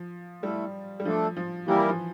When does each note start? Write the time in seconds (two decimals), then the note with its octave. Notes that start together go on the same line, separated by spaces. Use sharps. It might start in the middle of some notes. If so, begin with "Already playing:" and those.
Already playing: F3
0.43 G3 A3 E4 A4
1.00 G3
1.05 F3 A3 D4 A4
1.37 F3
1.67 E3 G3 A#3 E4 G4 A#4
1.89 F3